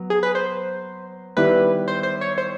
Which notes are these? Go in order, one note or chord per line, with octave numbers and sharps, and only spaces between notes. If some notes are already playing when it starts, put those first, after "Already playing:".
Already playing: F#3 B3
G#4
B4
C5
D#3 G3 B3 E4 G4 B4
C5
C5
C#5
C5